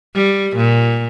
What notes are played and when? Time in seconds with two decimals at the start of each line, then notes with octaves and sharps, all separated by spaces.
0.15 G3
0.56 A#2